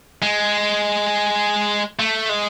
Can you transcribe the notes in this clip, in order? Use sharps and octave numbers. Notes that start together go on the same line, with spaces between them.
G#3
A3
G#3